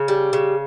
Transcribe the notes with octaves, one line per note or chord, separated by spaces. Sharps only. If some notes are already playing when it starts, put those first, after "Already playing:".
Already playing: C#3
G3
C#3